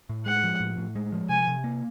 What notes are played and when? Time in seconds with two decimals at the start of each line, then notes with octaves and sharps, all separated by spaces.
0.09 A2
0.26 G#3 F#5
0.44 F3
0.60 A2
0.78 A2
0.95 G#3
1.12 F3
1.29 C3 G#5
1.48 C3
1.64 A#3